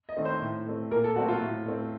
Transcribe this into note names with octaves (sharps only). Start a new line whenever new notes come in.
D#5
D#3 A3 C4
C5
A2
A3 C4
A#2 A#4
A4
F#3 A3 C4 F#4
F4
A2
A3 C4